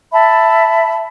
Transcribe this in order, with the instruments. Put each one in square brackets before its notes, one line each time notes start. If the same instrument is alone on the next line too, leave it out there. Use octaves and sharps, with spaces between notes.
[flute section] E5 A5 B5